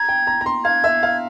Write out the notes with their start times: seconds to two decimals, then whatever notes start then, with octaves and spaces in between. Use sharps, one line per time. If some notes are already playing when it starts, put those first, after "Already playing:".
Already playing: A#5 G#6
0.09 G5
0.27 A#5
0.41 A#5
0.46 C6
0.64 F5 G#6
0.84 E5
1.03 F5